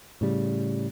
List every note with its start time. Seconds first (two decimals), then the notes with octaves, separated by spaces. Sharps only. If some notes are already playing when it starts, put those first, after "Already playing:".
0.21 A2 C#3 G3